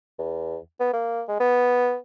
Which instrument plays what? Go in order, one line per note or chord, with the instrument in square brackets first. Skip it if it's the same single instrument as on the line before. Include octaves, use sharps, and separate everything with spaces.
[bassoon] E2
B3
A#3
G#3
B3